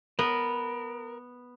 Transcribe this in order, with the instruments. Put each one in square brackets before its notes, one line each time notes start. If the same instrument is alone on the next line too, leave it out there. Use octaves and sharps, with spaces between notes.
[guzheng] B3 [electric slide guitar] A#4